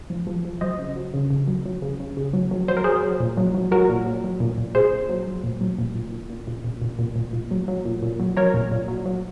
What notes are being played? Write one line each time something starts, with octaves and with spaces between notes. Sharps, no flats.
F3
F3
F3
F#3 C5 D#5
C#3
F#3
C#3
C#3
F#3
F#3
C#3
C#3
C#3
F#3
F#3
F#3 C5
A#4
F#3 G#4 C5
F#3
A#2
F#3
F#3
F#3 F#4 A#4
A#2
F#3
F#3
A#2
A#2
A#2 G#4 C5
A#2
F#3
F#3
A#2
F#3
A#2
A#2
A#2
A#2
A#2
A#2
A#2
A#2
A#2
A#2
F#3
F#3
A#2
A#2
F#3
F#3 A#4 C#5
A#2
A#2
F#3
F#3